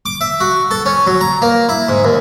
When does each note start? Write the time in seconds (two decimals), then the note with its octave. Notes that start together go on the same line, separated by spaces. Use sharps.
0.06 D6
0.21 E5
0.40 F#4
0.71 A4
0.86 C#4
1.07 F#3
1.21 A#5
1.42 A#3
1.69 E4
1.89 G#2
2.04 D#2